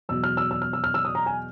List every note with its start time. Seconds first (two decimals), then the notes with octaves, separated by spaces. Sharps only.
0.09 E2 B2 F#3 E6
0.24 F6
0.37 E6
0.51 E6
0.62 F6
0.73 E6
0.84 F6
0.94 E6
1.05 D#6
1.15 A#5
1.26 G#5